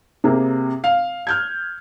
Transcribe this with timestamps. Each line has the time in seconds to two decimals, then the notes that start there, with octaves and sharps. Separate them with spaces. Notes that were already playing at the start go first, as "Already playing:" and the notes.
0.24 C3 A#3 G#4
0.84 F5
1.27 F6 G6 G#6